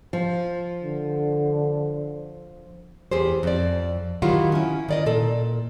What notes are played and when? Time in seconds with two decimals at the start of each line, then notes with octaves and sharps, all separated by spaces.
0.13 F3
0.84 D3
3.11 E2 G4 G#4 C5
3.43 F2 D5
4.22 D#3 F#3 E4 F4 G4 F#5
4.52 C#4 E4
4.88 D#3 D5 D#5
5.06 A#2 A4